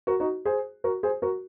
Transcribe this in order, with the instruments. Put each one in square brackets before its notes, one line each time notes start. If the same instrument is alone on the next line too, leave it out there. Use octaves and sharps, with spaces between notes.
[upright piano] F#4 A#4
D#4 F#4
G#4 C5
F#4 A#4
G#4 C5
F#4 A#4